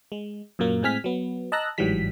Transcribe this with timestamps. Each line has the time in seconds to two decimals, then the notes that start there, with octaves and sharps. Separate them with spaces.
0.12 G#3
0.59 F#2 A#2 F#3 A#3
0.83 A2 G#3 C4 G#5 F6 B6
1.04 F#3 B3
1.52 D#5 A5 A#5 E6 F#6 A#6
1.78 A1 G#2 E3 F#3 G3 B6